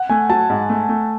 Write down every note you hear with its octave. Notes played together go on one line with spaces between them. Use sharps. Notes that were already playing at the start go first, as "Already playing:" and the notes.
Already playing: F#5
A3 G#5
F#3 A5
G#2
A3
A3